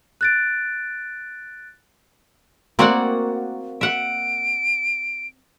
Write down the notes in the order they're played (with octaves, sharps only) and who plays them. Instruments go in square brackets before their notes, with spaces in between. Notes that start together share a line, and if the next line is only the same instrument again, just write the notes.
[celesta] F#6 A6 D7
[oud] A#3 F#4 [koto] C4 D5 F#5
[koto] E5 F#5 [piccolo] D7